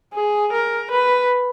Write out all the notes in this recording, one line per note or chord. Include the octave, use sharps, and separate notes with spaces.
G#4
A#4
B4